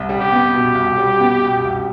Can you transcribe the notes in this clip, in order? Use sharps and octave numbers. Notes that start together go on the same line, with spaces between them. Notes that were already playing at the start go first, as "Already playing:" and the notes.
Already playing: C2
G3
G4
B3
B2
C2
G3
B3
B2
C2